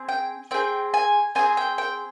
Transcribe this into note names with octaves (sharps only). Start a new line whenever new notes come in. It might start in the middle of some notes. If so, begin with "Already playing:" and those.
Already playing: C4 G#4
G5
C4 F4 G#4 G5
G#5
C4 F4 G#4 G#5
G5
G5